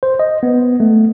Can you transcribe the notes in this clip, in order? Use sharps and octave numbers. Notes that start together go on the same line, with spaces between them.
C5
D#5
B3
A3